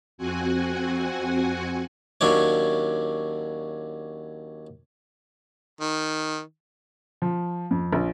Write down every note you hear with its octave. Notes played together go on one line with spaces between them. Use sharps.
F2 C4 F#4 F#5 G#5
D#2 F#3 C#4 D4 C#5
D#3
F3
F2
A#1